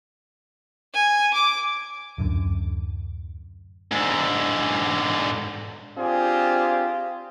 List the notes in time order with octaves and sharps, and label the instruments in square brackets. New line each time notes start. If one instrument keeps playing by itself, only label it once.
[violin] G#5
D6
[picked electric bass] D1 F#2 D3
[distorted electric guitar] G#2 D3
[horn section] C4 D4 F4 G4 G#4